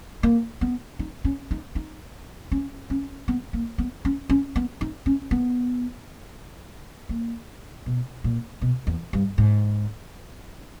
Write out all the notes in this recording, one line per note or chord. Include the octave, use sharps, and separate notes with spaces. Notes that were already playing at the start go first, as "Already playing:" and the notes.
A#3
B3
D#4
C#4
D#4
D#4
C#4
C#4
B3
A#3
B3
C#4
C#4
B3
D#4
C#4
B3
A#3
B2
A#2
B2
E2
G2
G#2